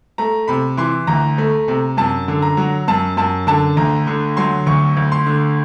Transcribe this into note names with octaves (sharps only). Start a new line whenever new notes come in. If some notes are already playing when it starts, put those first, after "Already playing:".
A3 A#5
C3 B5
E3 C6
D2 A#5
A3
C3
F#2 A5
D3
A#5
F#3
F#2 A5
F#2 A5
D3 A5
D2 A#5
D3
F#3 C6
D2 C#6
D2
C6
D3